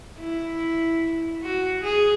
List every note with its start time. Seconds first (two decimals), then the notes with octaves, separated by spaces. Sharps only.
0.19 E4
1.43 F#4
1.84 G#4